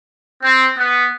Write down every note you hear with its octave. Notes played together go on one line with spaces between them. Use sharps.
C4
B3